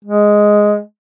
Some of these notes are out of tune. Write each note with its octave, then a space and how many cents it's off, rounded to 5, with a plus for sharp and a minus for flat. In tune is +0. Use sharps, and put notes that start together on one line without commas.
G#3 +0